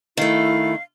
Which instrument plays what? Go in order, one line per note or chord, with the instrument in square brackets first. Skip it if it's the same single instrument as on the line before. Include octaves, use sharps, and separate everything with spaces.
[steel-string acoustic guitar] D#3 A3 [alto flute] E4 [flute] F5